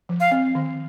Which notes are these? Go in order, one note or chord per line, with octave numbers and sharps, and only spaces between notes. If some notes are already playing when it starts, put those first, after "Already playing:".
F3
F5
C4
D#3